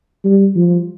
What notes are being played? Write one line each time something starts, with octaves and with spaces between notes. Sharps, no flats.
G3
F3